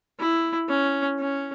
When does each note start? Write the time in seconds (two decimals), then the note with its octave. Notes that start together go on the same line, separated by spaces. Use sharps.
0.20 E4
0.69 C#4
1.19 C#4